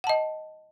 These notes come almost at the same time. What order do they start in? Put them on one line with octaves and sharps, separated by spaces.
F#5 A5 D#5